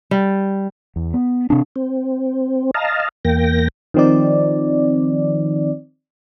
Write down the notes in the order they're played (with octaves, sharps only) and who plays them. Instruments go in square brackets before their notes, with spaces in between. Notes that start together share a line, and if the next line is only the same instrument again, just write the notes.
[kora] G3
[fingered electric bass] E2
B3
C3 C4 D4
[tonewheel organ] C4
D#5 F5 A5 A#5
E2 A#3 G5 A#6
[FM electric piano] D#3 F3 C4 D#4 D5